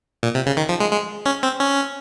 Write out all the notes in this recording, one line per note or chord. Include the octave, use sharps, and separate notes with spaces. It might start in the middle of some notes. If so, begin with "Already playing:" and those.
A#2
C3
C#3
D#3
F3
G#3
G#3
C#4
C4
C#4